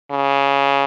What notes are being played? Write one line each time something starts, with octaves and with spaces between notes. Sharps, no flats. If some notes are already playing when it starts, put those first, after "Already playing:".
C#3